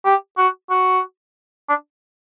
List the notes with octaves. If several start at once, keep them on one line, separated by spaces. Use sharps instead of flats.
G4
F#4
F#4
D4